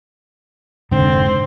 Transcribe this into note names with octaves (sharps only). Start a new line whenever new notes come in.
F1 G#2 D3 C4